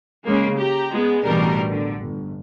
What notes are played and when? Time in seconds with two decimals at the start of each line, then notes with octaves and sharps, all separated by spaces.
0.25 C#3 G#3 A#3
0.57 G4 A#5
0.91 G#3 B3
1.23 A1 B2 E3 G3 D4 A#4
1.68 D3
1.99 G1